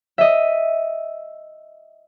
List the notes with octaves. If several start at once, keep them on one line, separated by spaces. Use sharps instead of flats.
D#5 E5